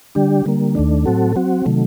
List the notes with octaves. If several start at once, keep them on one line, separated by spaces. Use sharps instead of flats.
D3 G3 D4 G4
D3 G3 A#3
D#2 D#3 A3 D4
A2 F#3 C4 F#4 A4
F#3 C4 F#4
C3 D#3 F#3 A3